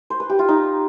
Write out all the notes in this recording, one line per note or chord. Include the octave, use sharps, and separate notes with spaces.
C5
B4
G4
F4
D#4